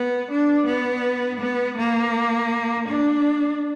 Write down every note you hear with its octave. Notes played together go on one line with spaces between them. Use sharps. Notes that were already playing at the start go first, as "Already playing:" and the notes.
Already playing: B3
D4
B3
B3
A#3
D4